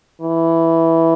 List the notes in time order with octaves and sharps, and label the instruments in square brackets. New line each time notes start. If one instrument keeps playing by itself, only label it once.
[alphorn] E3